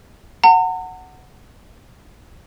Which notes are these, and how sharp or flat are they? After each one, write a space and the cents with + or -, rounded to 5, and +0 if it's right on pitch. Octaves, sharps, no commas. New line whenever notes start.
F#5 +0 A#5 -45